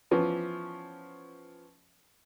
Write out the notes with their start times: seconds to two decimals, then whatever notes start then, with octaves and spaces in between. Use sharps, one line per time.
0.11 E3 F3 B3 C#4